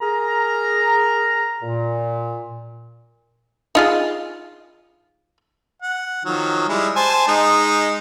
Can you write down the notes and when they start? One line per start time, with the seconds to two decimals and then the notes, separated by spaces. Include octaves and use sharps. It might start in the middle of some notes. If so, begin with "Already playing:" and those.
0.01 G#4 A#4 A#5
1.62 A#2
3.75 D#4 F4 G#4
5.82 F#5
6.25 D#3 F3 F#3
6.69 G3 G#3 E4
6.96 C5 G#5 A5
7.28 G#3 D#4